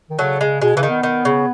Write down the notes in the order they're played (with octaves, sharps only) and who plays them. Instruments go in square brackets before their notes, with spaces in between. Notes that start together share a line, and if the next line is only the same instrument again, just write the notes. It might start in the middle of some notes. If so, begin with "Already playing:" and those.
[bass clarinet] D#3
[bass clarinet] C#3 [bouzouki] F#3 A3
[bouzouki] G#3
[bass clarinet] B2 [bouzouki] G#3
[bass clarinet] C#3 [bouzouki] E3
[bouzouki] D#3
[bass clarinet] B3
[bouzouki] D#3
C#3